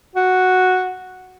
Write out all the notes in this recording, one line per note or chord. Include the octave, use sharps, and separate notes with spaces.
F#4